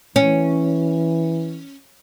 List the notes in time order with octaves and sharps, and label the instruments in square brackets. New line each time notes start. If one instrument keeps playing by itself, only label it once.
[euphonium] E3 [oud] C#4